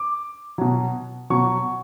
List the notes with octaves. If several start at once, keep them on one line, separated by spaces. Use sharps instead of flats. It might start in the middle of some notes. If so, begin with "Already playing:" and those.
Already playing: D6
B2 F#3
B2 F#3 C#6